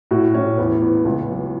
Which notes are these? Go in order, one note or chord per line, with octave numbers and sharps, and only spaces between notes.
A2 F#4
A2 C#4
E2 B3
E2
C#2
F#3